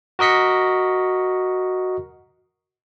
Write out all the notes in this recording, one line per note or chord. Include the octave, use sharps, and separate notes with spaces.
F#4 A#4 D#5 B6 C#7